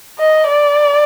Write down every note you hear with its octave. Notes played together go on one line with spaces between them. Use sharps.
D#5
D5